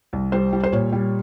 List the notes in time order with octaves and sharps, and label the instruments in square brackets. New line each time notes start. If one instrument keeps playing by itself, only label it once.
[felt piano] C2
G3 C5
G3
C5
A#2 C#5
G3